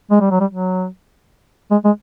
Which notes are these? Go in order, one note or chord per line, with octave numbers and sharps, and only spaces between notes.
G#3
G3
F#3
G3
F#3
G#3
G#3